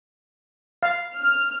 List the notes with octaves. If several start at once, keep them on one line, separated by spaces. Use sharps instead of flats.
F5
F6